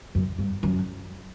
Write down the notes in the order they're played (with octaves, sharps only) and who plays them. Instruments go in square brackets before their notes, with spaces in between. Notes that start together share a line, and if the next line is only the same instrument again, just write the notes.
[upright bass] F#2
G2
F#2